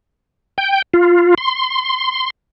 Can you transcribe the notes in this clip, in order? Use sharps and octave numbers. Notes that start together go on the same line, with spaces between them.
G5
F4
C6